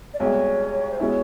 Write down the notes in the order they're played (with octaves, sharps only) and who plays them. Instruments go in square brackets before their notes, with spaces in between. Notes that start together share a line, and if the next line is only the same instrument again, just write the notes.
[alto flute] D5
[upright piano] C2 B2 G#3 [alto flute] C#5
[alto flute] C5
[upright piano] B2 G#3 C#4 E4 [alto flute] C#5